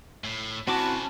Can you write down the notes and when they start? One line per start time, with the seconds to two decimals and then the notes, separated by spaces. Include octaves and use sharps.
0.24 A2
0.68 C4 C#4 E4 F#4 A5 B5 D6